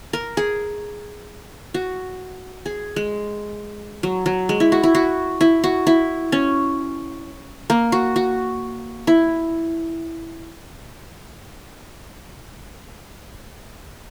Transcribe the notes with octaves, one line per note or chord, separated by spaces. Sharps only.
A#4
G#4
F#4
G#4
G#3
F#3
F#3
G#3
E4
F#4
E4
F#4
E4
F#4
E4
C#4
A#3
F#4
F#4
E4